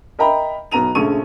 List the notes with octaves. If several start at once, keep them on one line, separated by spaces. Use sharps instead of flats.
A#4 D#5 E5 G5 A#5 B5
B1 B3 A#5 D#7 F7
A#1 C#3 A3 C#6 D#7